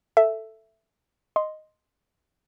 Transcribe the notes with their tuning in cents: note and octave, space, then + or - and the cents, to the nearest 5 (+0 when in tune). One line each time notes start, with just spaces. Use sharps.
A4 +5 E5 +5
D#5 -5 C6 +0